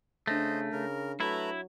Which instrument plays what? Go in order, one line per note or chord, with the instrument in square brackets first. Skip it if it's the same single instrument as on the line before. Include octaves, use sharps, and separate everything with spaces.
[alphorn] C#3 [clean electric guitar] A3 [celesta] D4 A#6 [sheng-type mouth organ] C5 D#5
[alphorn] C#3 [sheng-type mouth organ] A#4
[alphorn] F#3 [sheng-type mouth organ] A3 B4 A#5 [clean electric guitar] E4